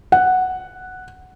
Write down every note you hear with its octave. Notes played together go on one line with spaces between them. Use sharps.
F#5